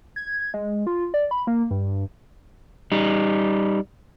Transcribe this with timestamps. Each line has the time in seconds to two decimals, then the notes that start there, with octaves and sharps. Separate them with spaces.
0.16 G#6
0.54 G#3
0.87 F4
1.14 D5
1.31 B5
1.47 A#3
1.71 G2
2.92 G3 D#4